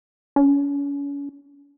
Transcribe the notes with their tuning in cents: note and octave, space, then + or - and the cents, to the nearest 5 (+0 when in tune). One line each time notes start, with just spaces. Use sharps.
C#4 +35